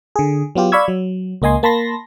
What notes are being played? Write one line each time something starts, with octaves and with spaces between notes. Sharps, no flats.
D3 G#4
F#3 B3 F4 G4
D5 F5 B5 C#6 E6 G#6
F#3
C#2 A#3 D#5 G#5 C6
A#3 A5 B5 C6 A#6